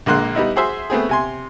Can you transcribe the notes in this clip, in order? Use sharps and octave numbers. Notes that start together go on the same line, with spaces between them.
A#1 D3 G#3 A#3 C6 F#6
G3 B3 D#4 E4
F#4 G#4 C5 E5
A3 B3 C4 G#4
C3 G#5 C6